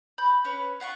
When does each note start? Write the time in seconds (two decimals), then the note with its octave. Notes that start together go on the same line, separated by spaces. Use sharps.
0.18 B5 G6
0.44 C#4 B4 C#5
0.80 F4 F#5 G#5 C#6